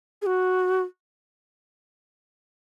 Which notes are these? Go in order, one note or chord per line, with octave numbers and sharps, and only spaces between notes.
G#4
F#4